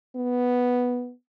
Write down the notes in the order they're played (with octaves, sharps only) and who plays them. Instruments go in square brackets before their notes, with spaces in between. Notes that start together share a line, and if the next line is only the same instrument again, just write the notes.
[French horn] B3